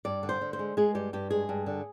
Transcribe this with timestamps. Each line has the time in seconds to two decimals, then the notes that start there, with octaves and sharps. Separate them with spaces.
0.05 G2 D5
0.23 D3
0.29 C5
0.41 D3
0.53 C5
0.59 G#3
0.77 G#3 G#4
0.95 G2 G4
1.13 G2 G4
1.31 G#3 G#4
1.49 G2
1.66 D3